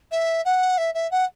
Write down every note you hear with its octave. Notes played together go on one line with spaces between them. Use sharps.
E5
F#5
E5
E5
F#5